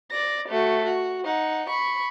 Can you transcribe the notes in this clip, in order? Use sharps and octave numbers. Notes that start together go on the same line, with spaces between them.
D5 A#6
A3 F#4
F#4
D#4 F#5
B5 C#6